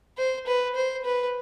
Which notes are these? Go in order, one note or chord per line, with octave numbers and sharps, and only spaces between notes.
C5
B4
C5
B4